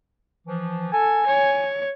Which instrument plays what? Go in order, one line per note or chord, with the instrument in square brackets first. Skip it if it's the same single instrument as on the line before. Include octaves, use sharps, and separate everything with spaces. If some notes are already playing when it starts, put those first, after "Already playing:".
[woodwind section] E3 F3
[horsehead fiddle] A4 [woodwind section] G#5
[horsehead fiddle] C#5